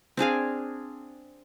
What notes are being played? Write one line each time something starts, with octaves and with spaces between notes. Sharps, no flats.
C4 D4 G#4 F5